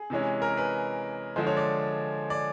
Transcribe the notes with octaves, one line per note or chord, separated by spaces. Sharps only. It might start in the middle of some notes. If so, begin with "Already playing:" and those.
Already playing: G#4
C3 E3 G#3 C#4
A#4
B4
D3 F3 G#3 C5
C#5
D5
D5